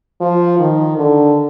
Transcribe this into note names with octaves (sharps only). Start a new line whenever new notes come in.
F3
D#3
D3